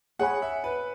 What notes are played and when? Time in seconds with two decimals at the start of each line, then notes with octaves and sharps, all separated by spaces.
0.19 G#4 C#5 F#5 G#5 B5
0.42 E5
0.64 B4